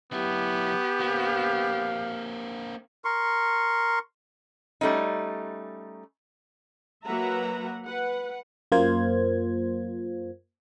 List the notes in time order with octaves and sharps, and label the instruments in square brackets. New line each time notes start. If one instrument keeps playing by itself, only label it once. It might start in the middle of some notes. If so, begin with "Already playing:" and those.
[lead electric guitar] F#3 E4 [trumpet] B3 [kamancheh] G4
[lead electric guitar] A#3 C4 [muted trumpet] F5
[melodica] A#4 C6 C#6
[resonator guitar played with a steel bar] G3 A3 C#4 D#4
[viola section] F#3 A#3 B4 E5 F#5 A#5
B4 F#5
[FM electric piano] F#2 A#3 F4 C5 G#6